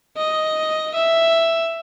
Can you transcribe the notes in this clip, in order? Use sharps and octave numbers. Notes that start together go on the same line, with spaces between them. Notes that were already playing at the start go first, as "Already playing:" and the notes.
D#5
E5